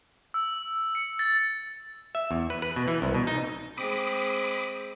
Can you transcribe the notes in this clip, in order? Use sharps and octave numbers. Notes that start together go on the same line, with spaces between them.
E6
C#7
A6
E5
E2
B4
B4
B2
E3
C2
B2
D#4
G#3 C4 B5 D6 D#6